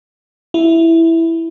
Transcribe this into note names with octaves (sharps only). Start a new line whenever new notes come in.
E4